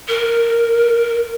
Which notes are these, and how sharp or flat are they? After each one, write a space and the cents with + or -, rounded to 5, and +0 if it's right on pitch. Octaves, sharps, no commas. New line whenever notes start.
A#4 -10